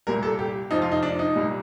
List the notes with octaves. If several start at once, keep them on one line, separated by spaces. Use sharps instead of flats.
C2 A#2 G3 A#4
A4
G4
F2 C3 F3 D#4
F4
D#4
D4
D#4
C2 A#2 G3